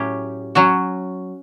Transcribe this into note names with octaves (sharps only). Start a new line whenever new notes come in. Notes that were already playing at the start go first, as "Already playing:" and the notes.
Already playing: A2 F#3 C#4 G4
F#3 C#4 F#4